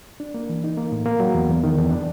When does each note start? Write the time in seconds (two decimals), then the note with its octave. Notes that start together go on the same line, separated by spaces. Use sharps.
0.20 D4
0.34 A#3
0.49 E3
0.64 D#4
0.77 A#3
0.92 A2
1.06 A#3
1.20 F#3
1.35 E2
1.49 E2
1.64 D#3
1.78 E2
1.91 D4